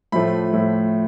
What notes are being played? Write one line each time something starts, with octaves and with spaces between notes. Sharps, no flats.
A2 F3 A3 B5
A2 F3 A3